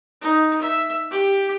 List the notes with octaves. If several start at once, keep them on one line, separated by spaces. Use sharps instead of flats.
D#4
E5
G4